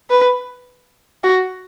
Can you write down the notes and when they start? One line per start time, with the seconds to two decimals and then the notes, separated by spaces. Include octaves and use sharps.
0.10 B4
1.24 F#4